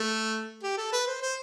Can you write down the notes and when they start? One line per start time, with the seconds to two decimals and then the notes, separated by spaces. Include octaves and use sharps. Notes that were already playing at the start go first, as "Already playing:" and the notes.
Already playing: A3
0.63 G4
0.77 A4
0.92 B4
1.07 C5
1.22 C5